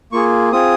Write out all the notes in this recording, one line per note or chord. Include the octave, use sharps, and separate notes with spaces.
A#3 F4 G#4 C#6
C4 F4 G#4 D#6